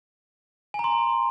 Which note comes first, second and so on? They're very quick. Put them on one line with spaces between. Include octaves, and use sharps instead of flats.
G#5 A#5 C6